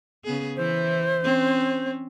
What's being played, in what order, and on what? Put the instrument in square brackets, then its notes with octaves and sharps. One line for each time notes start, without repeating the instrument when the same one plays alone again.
[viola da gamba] C#3 B3 G#4
[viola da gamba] E3 E4 [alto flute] C5
[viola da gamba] C4 C#4